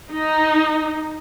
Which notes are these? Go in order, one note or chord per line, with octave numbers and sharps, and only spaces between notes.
D#4